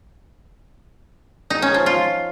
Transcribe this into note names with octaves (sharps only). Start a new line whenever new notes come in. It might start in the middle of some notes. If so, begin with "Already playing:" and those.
D#4
C#4
F3
F4